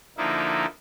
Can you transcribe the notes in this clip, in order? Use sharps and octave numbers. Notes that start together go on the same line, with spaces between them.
D3 F3 A#3 D#4 E4